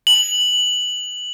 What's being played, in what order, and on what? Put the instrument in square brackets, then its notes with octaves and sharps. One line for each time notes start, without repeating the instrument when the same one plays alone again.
[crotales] F#7